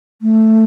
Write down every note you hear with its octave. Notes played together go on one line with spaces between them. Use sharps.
A3